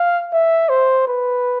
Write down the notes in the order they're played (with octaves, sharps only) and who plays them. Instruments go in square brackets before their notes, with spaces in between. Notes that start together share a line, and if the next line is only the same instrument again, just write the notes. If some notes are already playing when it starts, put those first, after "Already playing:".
Already playing: [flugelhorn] F5
E5
C5
B4